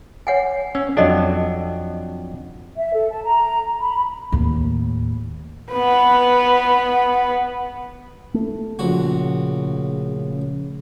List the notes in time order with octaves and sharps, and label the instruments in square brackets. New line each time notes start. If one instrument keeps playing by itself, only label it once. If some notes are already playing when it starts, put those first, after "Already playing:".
[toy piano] C#5 F#5 G#5
[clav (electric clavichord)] C#4 [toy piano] E6
[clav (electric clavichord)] F2 F#3 D4 [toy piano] A4 D5 D#5
[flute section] E5
A4
A5
A#5
B5
[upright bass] D#2 A2
[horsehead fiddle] B3 B4
[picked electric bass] A3
[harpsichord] A#1 F#4 [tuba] C#3